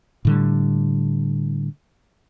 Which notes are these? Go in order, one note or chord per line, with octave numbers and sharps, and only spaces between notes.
A2 D3 G3